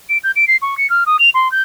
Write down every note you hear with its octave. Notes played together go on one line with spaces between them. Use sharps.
D7
G6
D7
C7
C#6
C#7
F6
D#6
F7
C6
G6